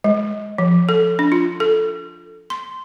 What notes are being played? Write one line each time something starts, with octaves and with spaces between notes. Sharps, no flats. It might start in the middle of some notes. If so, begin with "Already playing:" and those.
G#3
F3
A4
D4
F4
A4
C6